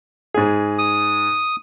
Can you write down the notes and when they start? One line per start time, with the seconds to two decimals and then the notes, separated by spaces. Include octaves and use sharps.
0.34 G#2 G#4
0.78 D#6